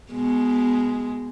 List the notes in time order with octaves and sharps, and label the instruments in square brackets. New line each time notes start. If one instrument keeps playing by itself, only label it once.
[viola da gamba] B2 G#3